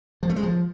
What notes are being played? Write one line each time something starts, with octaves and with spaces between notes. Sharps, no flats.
F3
A3
G#3
F3